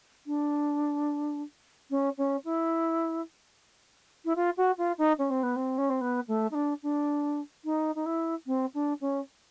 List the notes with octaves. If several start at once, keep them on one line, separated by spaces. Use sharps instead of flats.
D4
C#4
C#4
E4
E4
F4
F#4
F4
D#4
C#4
C4
B3
C4
C#4
C4
B3
A3
D#4
D4
D4
D#4
D#4
E4
C4
D4
C#4